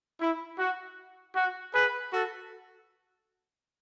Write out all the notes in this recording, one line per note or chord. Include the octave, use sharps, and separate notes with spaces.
E4
F#4
F#4
G#4 B4
F#4 A4